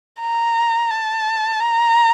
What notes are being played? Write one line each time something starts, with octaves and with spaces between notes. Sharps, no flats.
A#5
A5
A#5